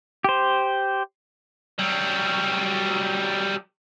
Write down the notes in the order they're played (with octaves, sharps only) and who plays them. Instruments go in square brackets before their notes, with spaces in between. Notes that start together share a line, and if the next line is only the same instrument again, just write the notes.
[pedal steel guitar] G4 C5
[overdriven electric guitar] F#3 G3